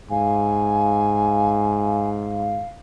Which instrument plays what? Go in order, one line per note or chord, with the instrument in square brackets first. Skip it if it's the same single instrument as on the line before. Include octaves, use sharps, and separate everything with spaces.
[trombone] G#2 [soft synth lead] F5 [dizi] G#5